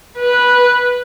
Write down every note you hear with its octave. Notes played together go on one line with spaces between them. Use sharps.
B4